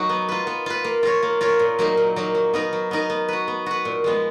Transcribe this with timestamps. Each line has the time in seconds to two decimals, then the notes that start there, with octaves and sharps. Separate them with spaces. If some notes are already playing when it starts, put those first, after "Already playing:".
Already playing: F#3 D#4 F#4
0.09 B3
0.29 F4 B4
0.47 B3
0.66 F4 B4
0.84 A#3
1.03 F4 A#4 C#5
1.23 A#3
1.41 F4 A#4 C#5
1.60 A#2
1.79 F#3 A#3 D#4
1.97 A#2
2.16 F#3 A#3 D#4
2.35 F#3
2.54 B3 D#4 A#4
2.73 F#3
2.91 B3 D#4 A#4
3.10 B3
3.28 F#4 B4
3.48 B3
3.66 F#4 B4
3.85 A#2
4.04 F3 G#3 B3